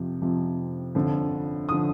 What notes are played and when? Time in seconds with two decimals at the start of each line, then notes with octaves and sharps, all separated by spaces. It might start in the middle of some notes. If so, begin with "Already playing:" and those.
Already playing: F2 C3 F3
0.21 F2 C3 F3
0.95 G1 F2 D3 F3
1.69 D3 F3 D#6